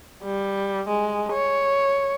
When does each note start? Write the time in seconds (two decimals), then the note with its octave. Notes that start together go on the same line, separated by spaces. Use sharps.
0.23 G3
0.88 G#3
1.33 C#5